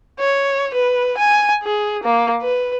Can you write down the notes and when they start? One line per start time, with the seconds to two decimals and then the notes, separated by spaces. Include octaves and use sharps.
0.19 C#5
0.75 B4
1.18 G#5
1.63 G#4
2.04 A#3
2.42 B4